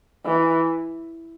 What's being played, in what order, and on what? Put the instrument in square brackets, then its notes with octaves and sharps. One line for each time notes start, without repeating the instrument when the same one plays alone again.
[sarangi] E3